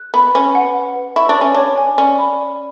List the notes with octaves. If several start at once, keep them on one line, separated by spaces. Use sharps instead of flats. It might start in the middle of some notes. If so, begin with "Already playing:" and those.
Already playing: F#6
B3 B5
C#4 B4
F#5
F#5
B4
E4 C#6
D4
C#4 C#5
D4 C#5
G#5
C#4 D5
B5
D5